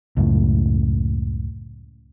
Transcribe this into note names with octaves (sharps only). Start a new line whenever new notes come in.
C#2 F#2 A2